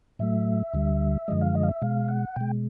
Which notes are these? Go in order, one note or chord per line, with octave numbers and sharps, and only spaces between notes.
A2 F#3 A3 E5
D2 D3 G3
F#2 D3 F3 G#3 D#5
F5
D#5
F5
E5
B2 G#3 F5
F#5
B2 G#3 G5